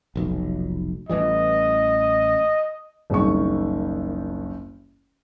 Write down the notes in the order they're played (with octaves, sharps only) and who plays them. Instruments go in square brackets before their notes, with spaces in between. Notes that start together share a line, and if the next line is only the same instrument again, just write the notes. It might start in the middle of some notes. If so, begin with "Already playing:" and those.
[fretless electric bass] F1 B1
[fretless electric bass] A1 E3 G3 [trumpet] D#5
[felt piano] F#1 C2 D#3 C#6